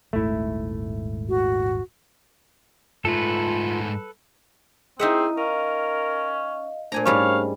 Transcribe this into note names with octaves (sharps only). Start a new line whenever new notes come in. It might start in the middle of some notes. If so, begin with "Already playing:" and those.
D#1 G#1 G#2 A3 E4
F#4
G#2 A3 F4 A4 B4
C4 D#4 E4 G#4 D#5 E5 F#5
C#4 A#4 D#5 F5
A#2 A3 D4 C5 G#5 A#5
G#2 G3 C#4 C#5 F5